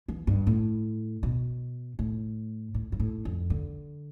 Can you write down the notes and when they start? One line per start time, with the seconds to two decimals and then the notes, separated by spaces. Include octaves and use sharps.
0.08 E3
0.27 G2
0.47 A2
1.23 B2
1.99 A2
2.74 A2
2.92 G2
3.00 A2
3.25 F2
3.50 D3